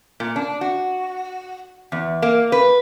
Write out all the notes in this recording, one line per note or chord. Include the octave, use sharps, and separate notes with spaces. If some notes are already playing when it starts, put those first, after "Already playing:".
A#2
D4
F#4
E2
A#3
B4